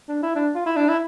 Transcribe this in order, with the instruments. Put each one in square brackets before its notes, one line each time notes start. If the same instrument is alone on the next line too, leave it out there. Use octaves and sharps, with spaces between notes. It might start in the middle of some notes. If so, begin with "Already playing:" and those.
[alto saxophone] D4
E4
D4
F4
E4
D4
E4